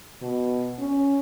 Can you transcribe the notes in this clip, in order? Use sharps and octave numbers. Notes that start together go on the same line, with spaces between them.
B2
C#4